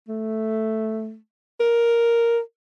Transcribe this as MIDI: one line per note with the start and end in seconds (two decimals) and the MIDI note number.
0.08 1.16 57
1.60 2.39 70